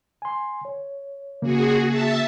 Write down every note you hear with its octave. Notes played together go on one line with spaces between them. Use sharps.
G#5 C6
C#5
C#3 A#3 F#4 G#4
E5 A5